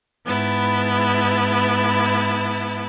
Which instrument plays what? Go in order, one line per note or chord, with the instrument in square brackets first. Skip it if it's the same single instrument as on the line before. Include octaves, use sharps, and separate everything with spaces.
[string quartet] G#2 B3 E4 A5